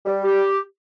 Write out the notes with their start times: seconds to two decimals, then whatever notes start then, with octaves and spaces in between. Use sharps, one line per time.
0.05 G3
0.24 G4